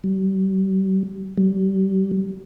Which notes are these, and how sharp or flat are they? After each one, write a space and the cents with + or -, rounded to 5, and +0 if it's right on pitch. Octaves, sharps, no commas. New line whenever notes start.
G3 -40
G3 -30